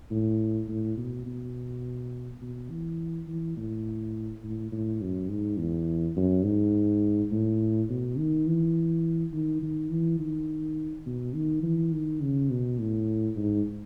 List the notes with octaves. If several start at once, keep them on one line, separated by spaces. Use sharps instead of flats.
A2
A2
B2
B2
B2
E3
E3
A2
A2
A2
F#2
G#2
E2
F#2
G#2
A2
B2
D#3
E3
D#3
D#3
E3
D#3
B2
D#3
E3
D#3
C#3
B2
A2
G#2